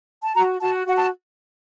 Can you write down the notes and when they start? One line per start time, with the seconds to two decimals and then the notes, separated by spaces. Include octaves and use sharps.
0.23 A5
0.34 F#4 A#5
0.60 F#4 A5
0.87 F#4 F#5
0.96 A5